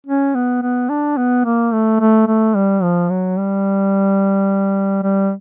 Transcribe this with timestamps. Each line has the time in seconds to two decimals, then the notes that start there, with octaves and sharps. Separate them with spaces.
0.07 C#4
0.35 B3
0.62 B3
0.90 D4
1.17 B3
1.45 A#3
1.72 A3
2.00 A3
2.27 A3
2.55 G3
2.82 F3
3.10 F#3
3.37 G3
5.03 G3